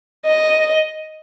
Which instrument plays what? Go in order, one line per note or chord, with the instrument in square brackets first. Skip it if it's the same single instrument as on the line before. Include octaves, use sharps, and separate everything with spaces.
[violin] D#5